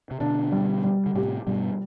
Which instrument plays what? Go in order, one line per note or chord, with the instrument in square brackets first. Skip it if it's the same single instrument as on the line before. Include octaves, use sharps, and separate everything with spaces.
[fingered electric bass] C3
[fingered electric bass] B2 D3 [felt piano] D4
[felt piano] G3
G3
[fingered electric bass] D3
[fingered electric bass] A2 C3 [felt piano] G4
[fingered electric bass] G2 B2 [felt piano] G3